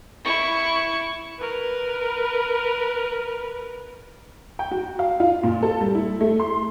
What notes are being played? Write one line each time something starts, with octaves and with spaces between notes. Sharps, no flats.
E4 C#6
A#4 B4
G5
F#4
F5
F4
A#2
A4
G3
E4
A3
C6